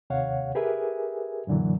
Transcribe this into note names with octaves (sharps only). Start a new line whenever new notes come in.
D#2 C3 C#5 F5 F#5
G4 G#4 A#4 B4 E5 G#5
F#2 A#2 D3 E3 F#3